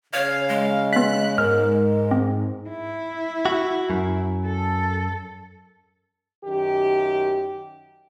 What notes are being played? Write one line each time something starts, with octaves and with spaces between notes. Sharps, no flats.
C#3 C#5 F5
G#3
B3 F#6 B6
G#2 A#4 F6
C4
E4
F#4
F#2
A4
F#2 D#3 G4